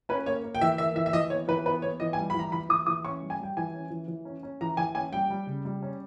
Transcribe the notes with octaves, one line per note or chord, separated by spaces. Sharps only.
C#4 B4
A#3 C#5
A#3
G5
E3 E5
A#3 E5
E3 E5
E5
E3 D#5
B3 C#5
E3 B4
B3 B4
B3 C#5
E3 D#5
G#5
G3
B5
E3 A#5
E3 B5
E3 D#6
E3 D#6
C#4 C#6
G3
G#5
G3 G5
E3 G#5
C#4
E3
E3
C#4
C#4
E3 A#5
E3 G#5
C#4 G#5
G3 G5
G3
C#3
G3
C#4